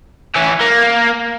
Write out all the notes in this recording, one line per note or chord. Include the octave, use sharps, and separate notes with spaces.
E3 C#4
A#3